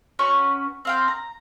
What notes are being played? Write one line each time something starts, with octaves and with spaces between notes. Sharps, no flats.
C#4 F#4 B4 C#6
C4 F5 G5
A#5